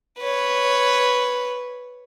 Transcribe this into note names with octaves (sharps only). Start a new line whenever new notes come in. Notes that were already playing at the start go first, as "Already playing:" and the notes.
B4 C#5